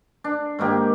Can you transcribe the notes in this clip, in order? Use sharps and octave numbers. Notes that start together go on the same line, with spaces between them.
D4
G#2 D#3 A#3 G4